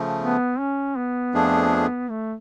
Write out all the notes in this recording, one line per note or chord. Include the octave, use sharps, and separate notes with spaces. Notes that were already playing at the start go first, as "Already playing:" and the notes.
Already playing: C#3 F3 A3
B3
C#4
B3
F2 F3 A3 D4 G#4
A3